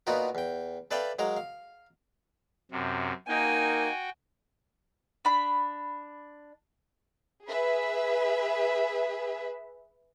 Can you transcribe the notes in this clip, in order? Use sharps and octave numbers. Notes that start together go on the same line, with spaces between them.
A#2 B3 D#4 F4 F#4 A#4
E2 G5
A4 B4 D5 E5 F5 G5
F#3 G#3 A#4 F5
F5
F#2 C3
A#3 D#4 F#4 G5 G#5
D4 B5
G#4 B4 E5